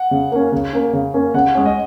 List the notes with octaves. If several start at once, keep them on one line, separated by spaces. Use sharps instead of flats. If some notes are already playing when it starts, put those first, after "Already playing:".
Already playing: F#5
C#3
A#3 C#4
C#3
A#3 C#4
C#3
A#3 C#4
C#3 F#5
G#3 C#4
D#5